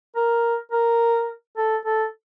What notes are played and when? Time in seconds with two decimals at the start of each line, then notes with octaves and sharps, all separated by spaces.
0.16 A#4
0.72 A#4
1.57 A4
1.85 A4